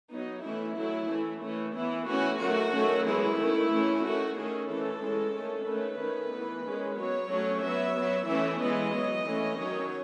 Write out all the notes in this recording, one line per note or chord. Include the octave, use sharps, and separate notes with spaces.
F#3 B3 D#4
E3 A3 C#4 E4
F#3 A3 C#4 E4
E3 A3 C#4
E3 A3 C#4
E3 B3 E4
E3 A3 C#4 F#4
D#3 F#3 A3 F#4
D#3 F#3 A3 C#4
E3 G#3 B3 E4
D#3 A3 C#4
E3 A3 C#4
D#3 A3 C#4 F#4
D#3 A3 C#4 G#4
E3 A3 C#4 A4
E3 G#3 C#4
D#3 A3 C#4
D#3 A3 C#4 B4
D#3 A3 C#4
E3 B3
D#3 G#3 C#4
F#3 B3 C#5
F#3 A3 C#4
F#3 B3 E5
F#3 B3
E3 A3 C#4 E5
E3 G#3 B3 D#5
F#3 B3
E3 A3 C#4
D#3 F#3 C#4 C#5